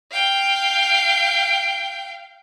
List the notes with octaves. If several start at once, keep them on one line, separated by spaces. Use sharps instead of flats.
F5 G5